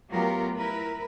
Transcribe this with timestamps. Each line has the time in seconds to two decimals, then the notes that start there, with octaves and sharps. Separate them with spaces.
0.11 F#3 A3 B3 F4 G4 A#4
0.56 E4 A#4 B4